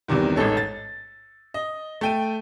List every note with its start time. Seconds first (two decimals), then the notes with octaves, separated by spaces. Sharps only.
0.08 E2 G2 C3 D#3
0.36 A1 G#2 D#4 A4 C#5
0.57 A6
1.54 D#5
2.01 A3 G5 D#7